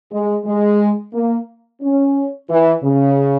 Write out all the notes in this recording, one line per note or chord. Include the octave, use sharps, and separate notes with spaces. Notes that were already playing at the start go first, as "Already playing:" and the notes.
G#3
G#3
A#3
C#4
E3
C#3